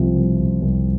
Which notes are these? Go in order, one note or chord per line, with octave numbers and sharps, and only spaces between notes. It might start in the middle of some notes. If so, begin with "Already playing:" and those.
Already playing: C2 C3 F3
C2
C3
C2